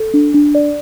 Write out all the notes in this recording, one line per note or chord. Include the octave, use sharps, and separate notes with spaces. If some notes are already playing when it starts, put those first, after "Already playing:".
Already playing: A4
D4
D4
D5